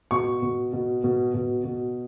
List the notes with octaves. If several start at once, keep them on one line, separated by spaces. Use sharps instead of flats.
B2 C#6
B2
B2
B2
B2
B2